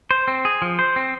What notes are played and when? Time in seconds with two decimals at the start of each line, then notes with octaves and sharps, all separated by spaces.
0.11 C5
0.28 C4
0.45 G#4
0.62 F3
0.79 C5
0.96 C4